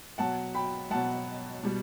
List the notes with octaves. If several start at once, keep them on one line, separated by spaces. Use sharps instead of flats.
B2 F#3 F#5 A5
G5 B5
B2 F#3 F#5 A5
B2 G3